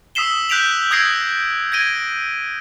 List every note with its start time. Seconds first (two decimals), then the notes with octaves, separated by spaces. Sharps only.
0.15 D#6 E6 B6 C7 E7 G7
0.49 F#6 G6 B6 D7 F7 F#7
0.91 D#6 E6 G#6 A#6 C7 D7
1.72 G#6 A#6 D7 D#7 G7